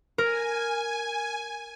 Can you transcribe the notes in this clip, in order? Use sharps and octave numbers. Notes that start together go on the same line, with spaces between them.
A#4 G#5